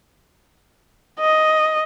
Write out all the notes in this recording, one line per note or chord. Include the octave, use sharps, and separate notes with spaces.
D#5